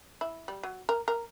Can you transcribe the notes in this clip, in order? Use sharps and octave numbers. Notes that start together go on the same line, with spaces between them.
E4
G3
F#3
A#4
A#4